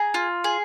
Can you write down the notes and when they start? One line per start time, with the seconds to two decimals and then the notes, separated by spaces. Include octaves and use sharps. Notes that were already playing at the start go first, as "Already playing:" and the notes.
Already playing: G#4 A#5
0.14 F4
0.44 G#4